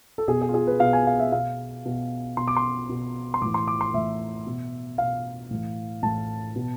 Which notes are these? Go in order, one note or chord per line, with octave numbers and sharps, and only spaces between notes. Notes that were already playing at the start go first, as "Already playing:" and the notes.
A4
B2 G#4
G#4
F4
G#4
B4
B2 F5
G#5
F5
E5
B2 F5
B2
B2 C6
D6
C6
B2
C6
A2 E3 D6
C6
D6
C6
A2 E3 E5
B2
B2 F5
A2 E3
A2 E3 A5
B2